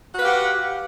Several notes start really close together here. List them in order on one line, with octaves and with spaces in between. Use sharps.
F#4 B4 F5 G4 F#5